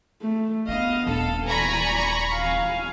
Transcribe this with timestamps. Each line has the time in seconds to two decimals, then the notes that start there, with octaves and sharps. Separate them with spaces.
0.22 A3
0.68 B3 D4 D#5 F5
1.07 D#1 D4 A4
1.47 D5 G#5 A#5 B5 C#6
2.35 F5 G#5